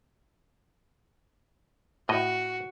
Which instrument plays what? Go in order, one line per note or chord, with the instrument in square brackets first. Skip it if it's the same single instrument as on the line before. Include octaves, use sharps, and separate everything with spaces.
[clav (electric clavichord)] A2 D#5 [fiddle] F#4